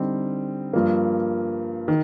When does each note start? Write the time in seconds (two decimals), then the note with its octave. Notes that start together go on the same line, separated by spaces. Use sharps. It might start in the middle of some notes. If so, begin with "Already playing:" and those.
Already playing: D3 G3 C4 D#4
0.73 G2 F3 A#3
1.88 D#3